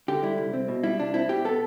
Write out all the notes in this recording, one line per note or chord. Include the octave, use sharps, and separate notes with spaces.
D3 G4
G3 E4
C2
C4
B2
G3 E4
C2 D4
C4 E4
B2 G4
B3 A4